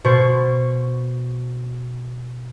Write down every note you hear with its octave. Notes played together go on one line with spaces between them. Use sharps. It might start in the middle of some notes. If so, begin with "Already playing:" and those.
B2 C5 C#6